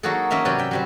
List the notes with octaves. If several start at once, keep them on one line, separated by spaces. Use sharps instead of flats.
F#3 A#3 D#4 F#4 G#4 A4
A#3 C#4 D#5 E5 A#5
C3 F#3 C#4 B4 D5 G5
E5 G5
F#3 G3 C4